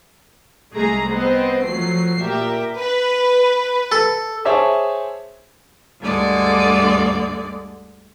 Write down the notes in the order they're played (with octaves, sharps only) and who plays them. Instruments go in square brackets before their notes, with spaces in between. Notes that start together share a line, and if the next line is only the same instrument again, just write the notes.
[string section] C2 G#3 A3 G#4 A#5
B3 C4 C5 D#5
F3 F#3 A3 C7
A#2 G4 A#4 E5
[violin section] B4
[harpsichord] A4
[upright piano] G#4 C5 C#5 E5 A5 D6
[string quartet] D2 G2 D3 G#3 D5